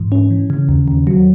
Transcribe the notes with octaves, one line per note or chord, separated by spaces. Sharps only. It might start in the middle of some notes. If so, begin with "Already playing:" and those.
Already playing: G#2 E3
C#4
E3
C#3
D#2
D#2
F#3